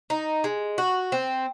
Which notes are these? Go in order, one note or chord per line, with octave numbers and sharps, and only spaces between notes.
D#4
G#3
F#4
C4